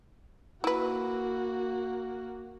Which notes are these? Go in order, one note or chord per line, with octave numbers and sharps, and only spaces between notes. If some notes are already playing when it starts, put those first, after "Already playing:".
A#3 E4 F#4 B4